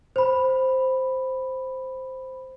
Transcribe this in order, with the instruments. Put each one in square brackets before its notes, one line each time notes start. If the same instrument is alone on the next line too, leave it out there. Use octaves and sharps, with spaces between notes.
[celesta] C5 B5